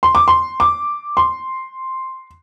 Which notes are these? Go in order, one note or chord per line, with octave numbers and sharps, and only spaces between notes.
C6
D6
C6
D6
C6